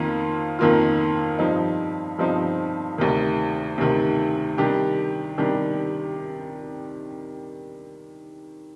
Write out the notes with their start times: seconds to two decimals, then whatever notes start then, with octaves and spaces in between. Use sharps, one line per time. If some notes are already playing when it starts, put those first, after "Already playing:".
Already playing: F2 D#3 A#3 F4
0.59 F2 D#3 A#3 F4
1.39 G2 F3 C4 D#4
2.18 G2 F3 C4 D#4
2.98 D2 C3 D#3
3.78 D2 C3 D#3
4.58 C3 D#3 G3 D4 G4
5.38 C3 D#3 G3 D4 G4